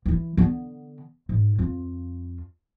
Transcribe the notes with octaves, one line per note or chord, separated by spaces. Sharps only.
E3 E4
D3 B3
G#2
F2 F4